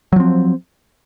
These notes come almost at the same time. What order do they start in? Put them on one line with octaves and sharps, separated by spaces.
F#3 F3 C4